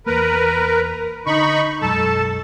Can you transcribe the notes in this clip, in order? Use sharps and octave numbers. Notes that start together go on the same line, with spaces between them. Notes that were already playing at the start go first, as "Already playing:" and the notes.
E2 A#3 A#4 B4
D3 D#4 B5 C#6
B1 F#2 G#3 A4 A5